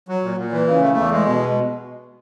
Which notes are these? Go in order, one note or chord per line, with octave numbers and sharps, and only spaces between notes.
F#3
A#2
A#2
E3
C#3
A3
E2
G#3
B2